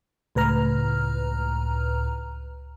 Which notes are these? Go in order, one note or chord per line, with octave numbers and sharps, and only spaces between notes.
C#2 A2 B4 A#5 F6